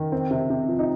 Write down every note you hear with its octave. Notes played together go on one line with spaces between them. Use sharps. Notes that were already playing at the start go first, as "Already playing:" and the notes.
Already playing: D#3
C4
C3
C3
F3
D#4